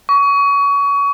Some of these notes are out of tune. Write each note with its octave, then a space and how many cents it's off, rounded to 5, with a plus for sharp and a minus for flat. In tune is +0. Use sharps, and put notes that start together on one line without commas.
C#6 +30